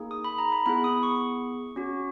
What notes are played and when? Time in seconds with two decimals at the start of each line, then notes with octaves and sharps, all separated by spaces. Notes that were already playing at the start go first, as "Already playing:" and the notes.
Already playing: A#3 D#4 G#4
0.11 D#6
0.24 B5
0.38 A#5
0.52 B5
0.66 B3 E4 G#4 B5
0.84 D#6
1.03 C#6
1.76 C#4 F#4